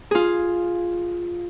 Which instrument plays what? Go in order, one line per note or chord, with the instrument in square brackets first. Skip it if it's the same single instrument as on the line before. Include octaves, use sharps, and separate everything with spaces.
[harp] F4 G#4